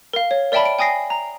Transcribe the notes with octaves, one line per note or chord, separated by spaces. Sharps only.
A#4 F5
C#5
A#4 D5 E5 G5 A5 B5
D7
G5 G#5 D#6 A#6 C7
A#5